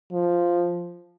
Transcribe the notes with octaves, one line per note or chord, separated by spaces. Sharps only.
F3